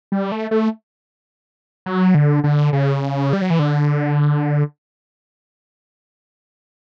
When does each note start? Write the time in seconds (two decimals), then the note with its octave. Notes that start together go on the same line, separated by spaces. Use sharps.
0.12 G3
0.32 A3
0.51 A3
1.86 F#3
2.15 D3
2.44 D3
2.73 C#3
3.33 G3
3.42 F#3
3.50 E3
3.59 D3